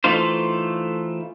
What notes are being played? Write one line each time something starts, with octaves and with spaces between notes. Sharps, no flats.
E3 A3 D#4 F4 C5